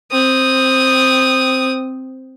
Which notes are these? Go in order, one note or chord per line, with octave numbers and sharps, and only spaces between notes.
C4 D#6